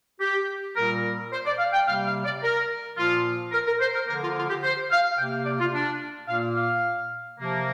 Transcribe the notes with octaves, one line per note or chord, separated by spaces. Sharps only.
G4
A#2 G3 A#3 A#4
C5
D5
F5
G5
C3 G3 A#3 F5
F5
D5
A#4
A#2 F3 A#3 F4
A#4
A#4
C5
A#4
D3 F3 A#3 A#4
F4
F4
G4
C5
F5
C3 A#3 G5
F5
D5
F4
D4
A#2 A#3 F5
F5
C3 F3 A#3